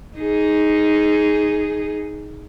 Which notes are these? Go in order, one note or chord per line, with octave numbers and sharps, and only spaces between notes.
D#4 G#4